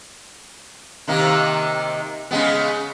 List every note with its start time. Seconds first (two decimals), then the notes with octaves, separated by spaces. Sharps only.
1.08 C3 D#3 A#3
2.31 C#3 G#3 B3